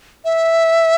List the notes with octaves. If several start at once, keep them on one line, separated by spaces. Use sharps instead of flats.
E5